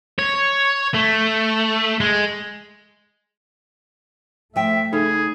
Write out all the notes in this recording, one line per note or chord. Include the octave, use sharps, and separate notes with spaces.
C#5
A3
G#3
F3 A3 E5 G5
C#3 D#4 G#4 A4